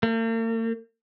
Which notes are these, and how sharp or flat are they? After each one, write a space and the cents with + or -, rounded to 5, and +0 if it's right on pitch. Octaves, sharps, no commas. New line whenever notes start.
A#3 -45